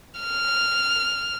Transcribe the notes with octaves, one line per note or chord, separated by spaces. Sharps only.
F6